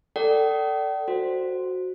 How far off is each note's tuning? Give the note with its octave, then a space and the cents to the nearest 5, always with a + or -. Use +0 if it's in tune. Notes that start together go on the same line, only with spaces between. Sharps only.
A4 +20 D5 +0 G5 -40
F#4 -5 C5 +0